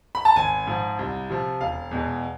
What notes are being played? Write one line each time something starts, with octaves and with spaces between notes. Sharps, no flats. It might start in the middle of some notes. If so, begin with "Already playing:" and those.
B5
A5
G#1 G#5
G#2 F3
C2
C3 F3
E1 F5
E2 B2 G#3